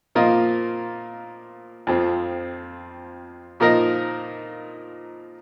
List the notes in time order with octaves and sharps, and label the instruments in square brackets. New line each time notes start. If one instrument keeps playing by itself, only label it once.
[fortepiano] A#2 F3 A#3 F4 D#5
F2 F3 C4
A#2 F3 D#4 A#4 D#5